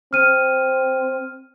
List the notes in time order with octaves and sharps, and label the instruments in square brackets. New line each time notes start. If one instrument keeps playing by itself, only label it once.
[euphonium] C4 [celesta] F6 D#7